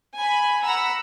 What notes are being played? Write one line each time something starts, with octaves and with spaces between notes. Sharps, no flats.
G#5 B5
F#5 A#5 B5 E6